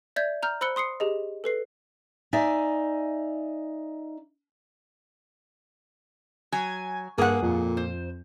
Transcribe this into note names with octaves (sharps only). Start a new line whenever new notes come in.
D5 E5 G6 G#6
A#5 F6 G6
C5 B5 E6 F#6 C#7 G7
C6 D#6 C7 C#7
G4 G#4 D#5
A4 B4 C7
D#4 D5 E5 G#5
F#3 G#5
G2 A#3 G#4 F#5
F2 A#2
C5